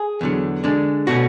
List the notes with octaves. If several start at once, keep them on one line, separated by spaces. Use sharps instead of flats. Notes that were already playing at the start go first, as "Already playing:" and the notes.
Already playing: G#4
E2 D3 F#3
D3 G#3 D4
B2 A3 C#4 F#4